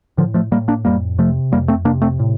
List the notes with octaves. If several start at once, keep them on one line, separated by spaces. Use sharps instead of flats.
A2 D3 F3
F3 A3
A2 G3 A#3
A#3 D4
F2 G3 A#3
C3 F3 A3
F2 G3 A#3
A3 C4
C3 A#3 D4
A3 C4
A2